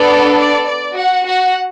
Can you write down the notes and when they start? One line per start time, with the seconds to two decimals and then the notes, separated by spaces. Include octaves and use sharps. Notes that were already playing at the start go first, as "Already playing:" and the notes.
Already playing: B3 D4 A4 D5
0.36 D5
0.66 D5
0.95 F#4 F#5
1.26 F#4 F#5